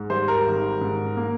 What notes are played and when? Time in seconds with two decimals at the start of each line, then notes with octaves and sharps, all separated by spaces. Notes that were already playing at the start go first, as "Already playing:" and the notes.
Already playing: G#2
0.10 G3 C5
0.28 A#4
0.46 G#1
0.81 G#2
1.17 A#3